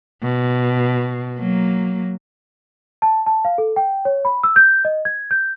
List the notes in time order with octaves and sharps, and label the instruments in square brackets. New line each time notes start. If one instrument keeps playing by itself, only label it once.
[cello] B2
F#3 A#3
[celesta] A5
A5
F5
A4
G5
C#5
B5
E6
G6
D#5
G#6
G6